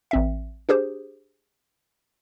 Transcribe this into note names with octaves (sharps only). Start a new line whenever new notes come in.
A1 C4 E5
D4 G4 G#4 C5